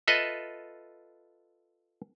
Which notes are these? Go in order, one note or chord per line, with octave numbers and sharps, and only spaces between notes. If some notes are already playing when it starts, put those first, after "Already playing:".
F4 A4 B4 D#5 E5